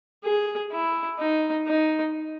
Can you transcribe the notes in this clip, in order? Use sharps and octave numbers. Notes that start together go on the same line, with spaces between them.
G#4
E4
D#4
D#4